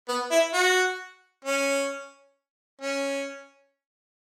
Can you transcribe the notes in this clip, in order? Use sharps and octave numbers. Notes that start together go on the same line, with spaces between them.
B3
E4
F#4
C#4
C#4